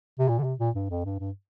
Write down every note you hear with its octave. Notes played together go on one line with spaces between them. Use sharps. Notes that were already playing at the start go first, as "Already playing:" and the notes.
C3
A#2
D3
C3
A#2
G2
F2
G2
G2